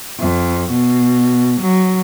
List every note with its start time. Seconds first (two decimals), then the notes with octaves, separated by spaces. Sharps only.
0.20 F2
0.71 B2
1.61 F#3